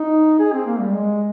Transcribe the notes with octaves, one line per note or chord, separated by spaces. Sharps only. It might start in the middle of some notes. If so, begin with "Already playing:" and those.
Already playing: D#4
G#4
C4
A#3
G3
G#3